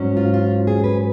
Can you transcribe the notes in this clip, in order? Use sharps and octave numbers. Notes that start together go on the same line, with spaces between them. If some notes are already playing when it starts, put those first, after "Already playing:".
Already playing: G#2 F#3 C#4
F4
F4
G#4
B4